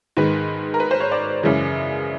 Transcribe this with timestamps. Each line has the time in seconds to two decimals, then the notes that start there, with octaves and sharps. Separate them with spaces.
0.17 G#2 D#3 G#3 B4
0.74 A#4
0.80 B4
0.91 C5
1.00 C#5
1.12 D5
1.43 F#2 C#3 E3 G#3